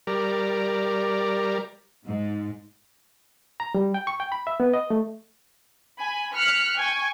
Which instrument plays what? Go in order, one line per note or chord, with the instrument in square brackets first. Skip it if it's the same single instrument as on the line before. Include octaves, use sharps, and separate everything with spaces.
[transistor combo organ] G3 A#4 D5
[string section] G#2
[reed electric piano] A#5
G3
G5
C#6
G5
B5
E5
B3
D#5
A3
[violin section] G#5 B5
F6 F#6 B6 C#7
G5 G#5 C#6